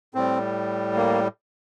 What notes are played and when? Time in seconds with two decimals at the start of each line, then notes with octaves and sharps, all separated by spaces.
0.14 A2 G3 C4
0.96 A#3